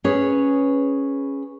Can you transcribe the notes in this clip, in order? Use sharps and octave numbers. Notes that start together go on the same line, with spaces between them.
C#4 G#4 B4 C#5